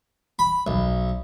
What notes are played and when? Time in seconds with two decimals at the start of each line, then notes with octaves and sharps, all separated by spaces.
0.39 B5
0.67 B1